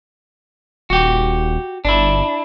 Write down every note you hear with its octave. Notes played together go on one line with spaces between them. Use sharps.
D#1 F#4 G4
G1 D4 E4